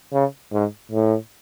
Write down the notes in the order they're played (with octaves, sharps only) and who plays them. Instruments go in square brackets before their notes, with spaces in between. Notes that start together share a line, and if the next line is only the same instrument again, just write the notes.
[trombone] C#3
G#2
A2